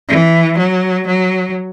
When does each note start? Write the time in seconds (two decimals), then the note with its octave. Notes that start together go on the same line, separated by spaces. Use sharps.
0.09 E3
0.58 F#3
1.07 F#3